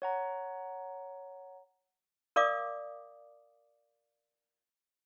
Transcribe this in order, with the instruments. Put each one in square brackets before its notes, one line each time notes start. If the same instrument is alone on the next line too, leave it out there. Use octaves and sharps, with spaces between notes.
[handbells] C#5 F#5 A#5
[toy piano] A#4 D5 F5 D6 D#6